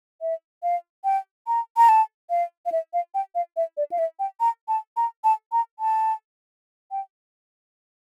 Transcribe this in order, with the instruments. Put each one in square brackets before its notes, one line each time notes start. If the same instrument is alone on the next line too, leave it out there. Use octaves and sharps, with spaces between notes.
[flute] E5
F5
G5
A#5
A#5
A5
F5
F5
E5
F5
G5
F5
E5
D5
F5
E5
G5
A#5
A5
A#5
A5
A#5
A5
G5